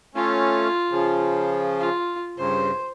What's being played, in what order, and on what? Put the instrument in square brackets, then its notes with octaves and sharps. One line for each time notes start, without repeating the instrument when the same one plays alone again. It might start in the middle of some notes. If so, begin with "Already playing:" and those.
[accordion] A3 C#4 [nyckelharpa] F4
[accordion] C#3 F3
[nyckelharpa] F4
[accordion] G2 C#3 [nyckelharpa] C5